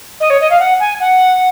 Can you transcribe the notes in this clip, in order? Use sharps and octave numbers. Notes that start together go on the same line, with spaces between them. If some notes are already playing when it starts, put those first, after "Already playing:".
D#5
C#5
D#5
F5
F#5
G#5
F#5